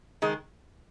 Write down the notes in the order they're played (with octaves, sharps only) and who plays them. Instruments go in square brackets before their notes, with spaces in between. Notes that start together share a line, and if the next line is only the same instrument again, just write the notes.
[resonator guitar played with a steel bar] D#3 G#3